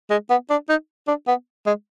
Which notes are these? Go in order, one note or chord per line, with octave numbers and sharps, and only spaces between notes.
G#3
B3
D4
D#4
D4
B3
G#3